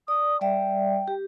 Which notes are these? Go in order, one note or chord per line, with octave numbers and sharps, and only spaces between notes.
D5 D#6
G3 D5 E5 G5
G4